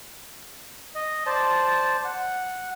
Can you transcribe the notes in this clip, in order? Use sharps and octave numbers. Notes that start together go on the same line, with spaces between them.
D#5
C5 D5 A5
F#5